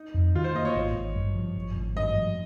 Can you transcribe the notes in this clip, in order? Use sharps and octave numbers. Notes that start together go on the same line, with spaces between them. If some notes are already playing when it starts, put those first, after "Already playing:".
Already playing: D#4
F2
D#3 F4
C5
A#3 D#5
C#5
G#1
G#1
G2
F3
G#1
G#1
G2 D#5
F3